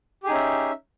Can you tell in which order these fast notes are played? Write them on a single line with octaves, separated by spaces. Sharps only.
G4 G#4 D#4 C#4 E5